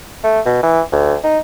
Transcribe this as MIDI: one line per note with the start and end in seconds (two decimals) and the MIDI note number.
0.24 0.40 57
0.45 0.62 47
0.63 0.81 52
0.92 1.15 38
1.24 1.39 63